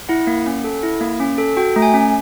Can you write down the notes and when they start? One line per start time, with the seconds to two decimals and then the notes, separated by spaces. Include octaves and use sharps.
0.09 E4 F#5
0.27 A#3
0.46 C#4
0.64 A4
0.83 E4
1.01 A#3
1.20 C#4
1.38 A4
1.57 F#4 G5
1.76 A3
1.82 G#5
1.94 C#4